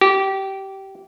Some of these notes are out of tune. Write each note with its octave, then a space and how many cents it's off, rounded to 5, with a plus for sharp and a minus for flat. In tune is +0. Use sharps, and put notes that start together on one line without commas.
G4 -20